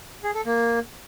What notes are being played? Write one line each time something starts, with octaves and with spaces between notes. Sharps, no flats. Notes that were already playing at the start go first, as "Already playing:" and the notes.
G#4
A4
A#3